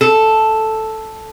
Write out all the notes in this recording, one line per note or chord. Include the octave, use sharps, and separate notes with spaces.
A4